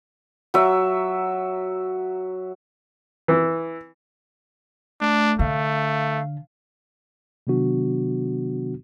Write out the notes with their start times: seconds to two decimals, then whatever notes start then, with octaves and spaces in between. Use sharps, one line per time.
0.54 F#3 E5
3.28 E3
5.01 A3 D4
5.39 D3 A3 F5
7.47 C3 D#3 F#3 B3 D4 F#4